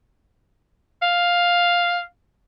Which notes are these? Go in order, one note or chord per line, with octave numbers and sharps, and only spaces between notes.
F5